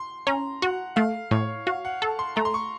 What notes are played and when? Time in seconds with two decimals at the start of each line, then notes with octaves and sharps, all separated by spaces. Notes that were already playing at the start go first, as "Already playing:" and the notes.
Already playing: C6
0.27 C#4 A#5
0.62 F#4 F#5
0.96 A3 F5
1.31 A2 C#5
1.67 F#4 F5
1.85 F#5
2.02 A4 A5
2.19 C6
2.36 A3 A#5
2.45 C6
2.54 C#6